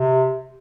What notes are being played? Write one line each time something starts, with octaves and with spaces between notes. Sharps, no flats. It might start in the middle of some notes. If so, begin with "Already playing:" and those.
Already playing: C3